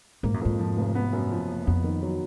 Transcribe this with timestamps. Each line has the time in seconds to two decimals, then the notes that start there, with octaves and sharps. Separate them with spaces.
0.23 G#2 A#3
0.34 F#2
0.41 F2 G#2
0.59 F3
0.77 F1
0.95 B3
1.13 F#2
1.31 F3
1.49 F#1
1.67 F2 B3
1.84 D#3
2.02 F#3